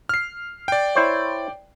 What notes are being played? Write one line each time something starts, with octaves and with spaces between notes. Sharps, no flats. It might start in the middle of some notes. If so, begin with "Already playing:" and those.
F6 C7
D5 G5
E4 C5 C#5